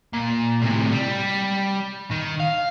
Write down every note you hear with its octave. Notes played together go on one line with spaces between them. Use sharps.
A#2
A2 C3
G3
D#3
F5